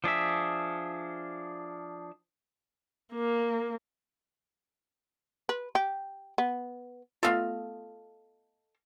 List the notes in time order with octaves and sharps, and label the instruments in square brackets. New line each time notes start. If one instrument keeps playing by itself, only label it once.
[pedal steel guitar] F3 D4 G#4 E5
[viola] A#3
[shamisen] B4
G4
B3
[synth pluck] A3 B3 F4 [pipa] A4 D#5 F5